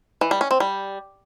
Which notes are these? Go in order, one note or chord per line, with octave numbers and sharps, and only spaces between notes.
E3
G3
C#4
C4
G3